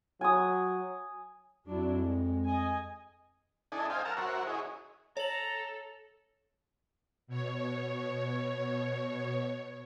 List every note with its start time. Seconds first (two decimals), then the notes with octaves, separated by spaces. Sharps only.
0.21 F#3 G#5 D#6
1.67 F2 F#3 D4 E4
2.05 G#3
2.44 D#5 G#5
3.72 D4 E4 A4 D#5 G#5
3.90 C5 D#5 F5 G5 G#5
4.05 A#4 F#5 A5 A#5 E6 F6
4.17 F#4 A#4 C5 C#5 E5 F#5
4.47 E4 G#4 C#5 D#5
5.17 A4 C#5 A#5 F#7
7.27 B2 C#5